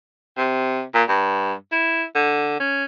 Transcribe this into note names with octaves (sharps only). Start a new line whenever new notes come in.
C3
A#2
G2
E4
D3
C#4